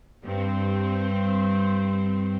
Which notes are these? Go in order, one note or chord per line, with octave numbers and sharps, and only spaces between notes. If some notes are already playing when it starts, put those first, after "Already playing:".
G2 C4